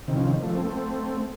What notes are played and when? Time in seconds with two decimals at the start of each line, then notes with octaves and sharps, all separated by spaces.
0.08 C3 D#3
0.16 C#3 F3
0.25 C3 D#3
0.43 F3 A3
0.55 A3 C4
0.67 A3 C4